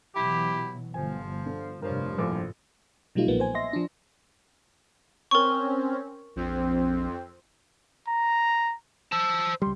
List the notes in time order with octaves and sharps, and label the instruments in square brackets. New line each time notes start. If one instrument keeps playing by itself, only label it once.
[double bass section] B2 E3 F#3 [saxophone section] E4 G4
[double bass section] G1 [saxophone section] F3 [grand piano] G#5
[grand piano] D3
[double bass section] F1 G2 [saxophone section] F3 [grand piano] A#4 C#5
[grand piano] A#1 A2 D6
[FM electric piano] B2 F#3 G3 A3 D#4 F4
B1 A#2 F3 A#3 B3
C5 G#5
D#5 E5 C6 A#6
F3 D4
[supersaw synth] C4 C#4 [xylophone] A#4 C#6
[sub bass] A#1 [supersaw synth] F2 C4
[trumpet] A#5
[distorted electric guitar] C5 A5 [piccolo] E6
[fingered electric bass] C#2 G3 [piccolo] C6